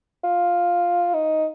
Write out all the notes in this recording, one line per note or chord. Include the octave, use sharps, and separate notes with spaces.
F4
D#4